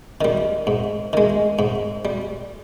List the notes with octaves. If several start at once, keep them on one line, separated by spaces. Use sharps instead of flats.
D#3 G3
G#2
D#3 G#3
G#2
G3